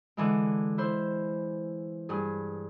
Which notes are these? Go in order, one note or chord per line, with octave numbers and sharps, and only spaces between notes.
D3 E3 G#3
E4 C5
G2 G#4